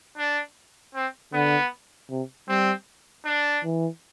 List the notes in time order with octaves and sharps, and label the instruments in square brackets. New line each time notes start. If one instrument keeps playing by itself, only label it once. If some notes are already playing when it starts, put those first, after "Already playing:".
[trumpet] D4
C4
[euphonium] D3 [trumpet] B3
[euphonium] C3
[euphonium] G3 [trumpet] C4
[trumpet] D4
[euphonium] E3